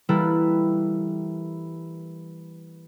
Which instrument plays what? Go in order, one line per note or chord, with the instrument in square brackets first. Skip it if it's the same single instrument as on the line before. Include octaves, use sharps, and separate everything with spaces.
[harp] E3 G3 A#3 E4 A4 B4